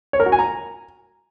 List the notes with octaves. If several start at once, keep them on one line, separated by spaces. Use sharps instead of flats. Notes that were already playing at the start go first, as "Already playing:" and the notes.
C#5
A#4
F#4
G#5
A#5